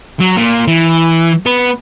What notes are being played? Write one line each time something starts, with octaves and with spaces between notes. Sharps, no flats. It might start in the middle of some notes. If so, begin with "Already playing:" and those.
F#3
A#2
E3
B3